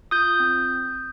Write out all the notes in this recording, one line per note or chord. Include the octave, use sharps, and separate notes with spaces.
F4 D#6 G6
C4